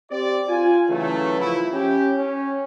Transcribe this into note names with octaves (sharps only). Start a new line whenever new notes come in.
C4 G4 D5
F4 G#5
C#3 E3 F#3 A3
F3 E4
C#4 G4
C#4